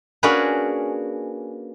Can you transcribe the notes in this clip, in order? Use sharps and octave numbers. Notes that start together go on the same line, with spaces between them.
A#3 C#4 D4 F#4 G#4 B4